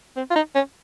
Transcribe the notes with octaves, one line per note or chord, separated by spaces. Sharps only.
C4
F4
D#4
C#4